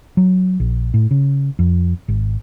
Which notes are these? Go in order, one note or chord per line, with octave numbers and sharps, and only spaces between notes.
F#3
A#1
A2
C#3
F2
G#1